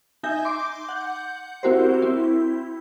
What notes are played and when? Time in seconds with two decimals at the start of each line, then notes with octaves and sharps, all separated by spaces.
0.23 D#4 E5 G#5 G6 A#6
0.45 C6 D6
0.89 F#5 G6
1.63 C4 E4 F#4 G4 A#4 C5
2.02 C4 E4